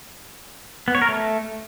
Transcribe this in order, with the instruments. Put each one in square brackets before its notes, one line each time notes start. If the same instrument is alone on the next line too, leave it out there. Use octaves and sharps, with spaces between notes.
[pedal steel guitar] B3
C#5
A#4
A3